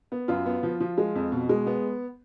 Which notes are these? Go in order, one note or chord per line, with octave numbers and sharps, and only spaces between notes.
B3
F#2 F4
B3
F3
F3
G#3
F2
B2
G#3
B3